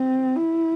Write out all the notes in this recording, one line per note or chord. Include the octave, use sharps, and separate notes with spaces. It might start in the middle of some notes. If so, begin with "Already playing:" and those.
Already playing: C4
E4